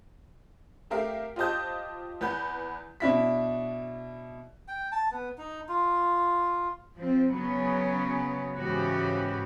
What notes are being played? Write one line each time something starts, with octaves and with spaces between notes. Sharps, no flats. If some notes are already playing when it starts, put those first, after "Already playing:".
A3 G4 A#4 E5 F5
F4 G4 C5 D#5 A5 G6
E2 B4 F#5 G6
B2 D4 E4 B6
G5
A5
B3
D#4
F4
F3 C4
C#3 F#3 B3 C#4
G#2 C#3 E3 C#4 F#4 G4